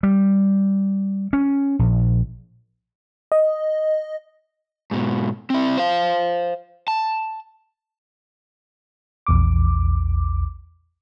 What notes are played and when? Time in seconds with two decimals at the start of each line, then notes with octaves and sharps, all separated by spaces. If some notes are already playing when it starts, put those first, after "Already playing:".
0.03 G3
1.33 C#4
1.79 A#1
3.32 D#5
4.91 G#2 B2
5.50 C4 E4
5.78 C5 F5
6.88 A5
9.27 A#1 E2 D6